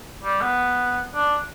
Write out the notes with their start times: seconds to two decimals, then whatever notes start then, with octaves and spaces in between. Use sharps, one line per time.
0.23 G3
0.42 B3
1.15 D4